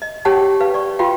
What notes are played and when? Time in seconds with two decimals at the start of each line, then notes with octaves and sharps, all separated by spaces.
0.02 D#5
0.25 G4 C#5 F#5 G5 A5
0.60 B4 F5
0.74 D5 C#6
0.99 F4 F#4 B4 F5 G5